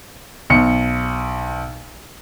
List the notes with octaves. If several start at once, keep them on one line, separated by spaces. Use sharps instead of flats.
B1 C#7